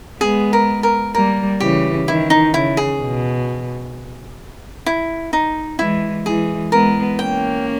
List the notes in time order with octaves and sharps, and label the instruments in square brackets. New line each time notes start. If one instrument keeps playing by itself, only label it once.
[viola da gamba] G#3 B3 [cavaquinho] G#4
[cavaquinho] A#4
A#4
[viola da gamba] G3 A#3 [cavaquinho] A#4
[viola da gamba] C#3 E3 [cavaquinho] G4
[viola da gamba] D#3 [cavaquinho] E4
[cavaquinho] D#4
[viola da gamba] C#3 [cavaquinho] E4
[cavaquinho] G#4
[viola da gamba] B2
[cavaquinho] E4
D#4
[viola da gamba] E3 G#3 [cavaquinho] E4
[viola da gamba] E3 G#3 [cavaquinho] G#4
[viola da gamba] G#3 B3 [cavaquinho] A#4
[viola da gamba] A#3 C#4 [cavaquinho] G5